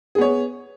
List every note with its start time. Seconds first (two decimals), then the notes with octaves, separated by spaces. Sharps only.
0.15 G#4
0.18 B3
0.21 C#5